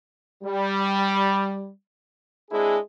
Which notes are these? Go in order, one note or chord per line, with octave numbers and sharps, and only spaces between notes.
G3
G#3 C4 D4 E4 G#4